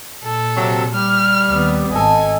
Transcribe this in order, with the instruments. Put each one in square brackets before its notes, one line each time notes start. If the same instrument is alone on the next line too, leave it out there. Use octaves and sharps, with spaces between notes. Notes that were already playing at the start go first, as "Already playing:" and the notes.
[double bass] A#2 [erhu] A4
[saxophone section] C3 F#3
[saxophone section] G3 [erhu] F6
[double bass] D#2 B3
[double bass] G#1 [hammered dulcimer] A4 D#5 [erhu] G#5